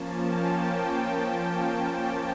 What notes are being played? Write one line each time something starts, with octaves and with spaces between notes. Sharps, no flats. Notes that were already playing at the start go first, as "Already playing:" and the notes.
Already playing: F3 A#3 C#4 A5
G5